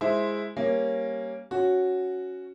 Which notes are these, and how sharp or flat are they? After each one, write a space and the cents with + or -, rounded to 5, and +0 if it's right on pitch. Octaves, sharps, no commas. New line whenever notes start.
G#3 +0 E4 +0 C5 +0
G3 -10 A#3 +0 C#4 -15
C#4 +0 F#4 +0